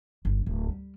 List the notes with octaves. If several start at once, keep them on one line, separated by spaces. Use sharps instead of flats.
G1
D1
G3